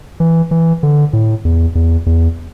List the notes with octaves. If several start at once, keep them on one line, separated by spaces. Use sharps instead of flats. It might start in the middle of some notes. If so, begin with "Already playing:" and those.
E3
E3
D3
A2
E2
E2
E2